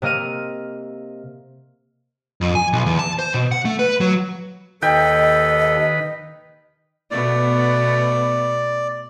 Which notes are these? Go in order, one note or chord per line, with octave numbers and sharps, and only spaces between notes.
C3 A#3 D#5 F6 D#7
F2
G#5
B1
E2
A5
C5
B2
F#5
A3
B4
F#3
D#2 D#3 A4 B4 D#5 G5
B2 A3 B3 D5